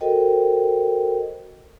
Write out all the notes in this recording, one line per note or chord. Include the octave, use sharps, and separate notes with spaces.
F#4 A4 A#4 C5 D#5 G5